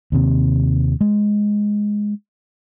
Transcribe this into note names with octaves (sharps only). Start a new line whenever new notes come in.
D#2 C3
G#3